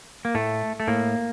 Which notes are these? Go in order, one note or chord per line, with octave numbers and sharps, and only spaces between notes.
A#3
A2 A3
A3
A2 A#3